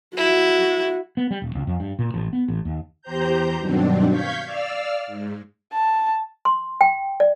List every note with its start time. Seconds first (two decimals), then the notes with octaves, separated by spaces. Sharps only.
0.17 E4 F#4
1.17 B3
1.31 G3
1.42 D#1
1.55 C#2
1.67 F2
1.80 G2
1.99 A#2
2.14 A1
2.33 B3
2.48 A1
2.65 D#2
3.02 E2 G4 C5 A#5 G6
3.58 G2 B2 D#3 F#3 C4 D4
4.10 F5 C#6 G6 G#6 B6
4.45 D5 F5 E6 F6
5.07 G#2
5.73 A5
6.45 C6
6.81 G5
7.20 D5